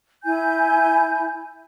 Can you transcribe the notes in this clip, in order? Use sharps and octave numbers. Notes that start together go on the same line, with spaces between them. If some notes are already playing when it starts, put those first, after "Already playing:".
E4 G#5 G6